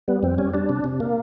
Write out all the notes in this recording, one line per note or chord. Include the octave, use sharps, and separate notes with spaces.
G3 B3
F2 C4
G3 C#4
G3 D4
C3
C3
A#3